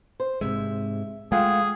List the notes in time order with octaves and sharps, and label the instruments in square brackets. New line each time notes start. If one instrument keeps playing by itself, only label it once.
[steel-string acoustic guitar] C5
[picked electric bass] G#2 C3 G#3 [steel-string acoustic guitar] E5
[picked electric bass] G#3 A3 [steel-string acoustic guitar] F4 F#5 G5 [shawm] G#4